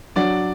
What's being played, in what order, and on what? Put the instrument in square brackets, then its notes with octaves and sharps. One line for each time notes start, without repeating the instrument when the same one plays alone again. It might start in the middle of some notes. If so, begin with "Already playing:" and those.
[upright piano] F#3 [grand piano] D4 D5